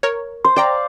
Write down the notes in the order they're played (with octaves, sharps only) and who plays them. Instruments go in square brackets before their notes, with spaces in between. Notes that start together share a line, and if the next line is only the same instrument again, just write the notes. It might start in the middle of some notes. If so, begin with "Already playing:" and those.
[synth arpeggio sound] A#4 C#5
[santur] C5 [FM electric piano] C6
[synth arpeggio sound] C5 G5 A#5 [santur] D5 F5